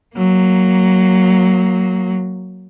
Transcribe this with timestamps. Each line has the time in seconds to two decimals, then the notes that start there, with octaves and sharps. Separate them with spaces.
0.16 F#3 A#3